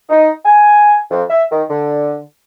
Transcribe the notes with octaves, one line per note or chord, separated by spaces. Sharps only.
D#4
G#5
F2
E5
D#3
D3